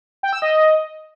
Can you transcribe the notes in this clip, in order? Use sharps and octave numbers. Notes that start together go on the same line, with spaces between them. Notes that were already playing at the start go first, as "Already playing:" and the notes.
G5
E6
D#5